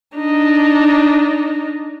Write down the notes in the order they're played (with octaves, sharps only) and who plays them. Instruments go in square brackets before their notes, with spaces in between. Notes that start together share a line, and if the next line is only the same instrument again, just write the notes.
[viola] D4 D#4